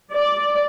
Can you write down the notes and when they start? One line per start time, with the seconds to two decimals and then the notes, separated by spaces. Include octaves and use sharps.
0.13 D5